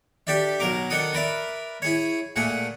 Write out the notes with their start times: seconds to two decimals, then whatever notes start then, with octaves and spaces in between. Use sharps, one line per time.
0.27 D4 G4 A4 D5 E5
0.60 B1 F#3 A#4 A#5 D6
0.90 D#3 D4 A4 F#5 D#6
1.13 A#4 B4 D5 E5
1.82 E4 G#4 C#5
2.36 A#2 A3 G#4 F#5